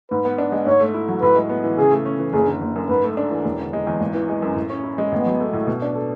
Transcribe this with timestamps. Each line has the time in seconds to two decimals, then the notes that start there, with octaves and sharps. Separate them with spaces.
0.10 G#2 B4
0.25 B3
0.38 D4
0.52 G#3
0.66 G#2 C#5
0.80 A3
0.94 E4
1.08 F#3
1.22 A2 B4
1.36 G#3
1.49 B3
1.64 E3
1.78 C#3 G#4
1.91 A3
2.05 C#4
2.19 E3
2.33 F#1 G#4
2.47 D3
2.61 F#1
2.76 F#2
2.89 G#2 B4
3.03 A3
3.17 D4
3.31 E3
3.45 E1
3.59 D3
3.73 G#3
3.87 E2
4.00 G#1
4.14 E3
4.29 G#3
4.42 F#2
4.56 A2
4.70 C#4
4.84 E4
4.98 G#3
5.12 A1 B3
5.26 F#3
5.40 A3
5.53 A2
5.67 B2
5.82 D4
5.95 A4